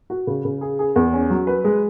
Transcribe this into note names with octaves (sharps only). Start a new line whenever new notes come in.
F#4
C#3
C#3
G#4
G#4
E2
C#4
F#3
B4
G#3